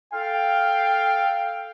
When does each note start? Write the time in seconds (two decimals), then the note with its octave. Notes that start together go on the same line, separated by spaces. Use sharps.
0.14 A4 F5 G5